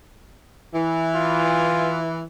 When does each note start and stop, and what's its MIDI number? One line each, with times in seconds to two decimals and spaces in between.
0.73 2.21 52
1.15 2.05 65